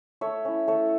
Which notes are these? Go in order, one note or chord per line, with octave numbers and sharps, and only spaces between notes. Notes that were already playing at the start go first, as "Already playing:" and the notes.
A3 C#5 E5
C#4 E4
A3 A4 C#5